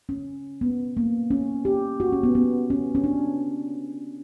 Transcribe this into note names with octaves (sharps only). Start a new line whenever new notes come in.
C#4
B3
A#3
C#4
G4
F#4
C#4
B3
B3
C#4
C#4
D4